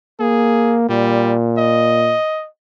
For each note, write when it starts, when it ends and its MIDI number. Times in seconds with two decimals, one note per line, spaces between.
0.20 0.85 58
0.20 0.78 68
0.89 2.15 46
0.89 1.36 55
1.58 2.48 75